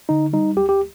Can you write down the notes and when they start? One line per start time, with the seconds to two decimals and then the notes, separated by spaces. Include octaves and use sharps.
0.09 D3 D#4
0.33 G3 D#4
0.56 D2 G4
0.69 G4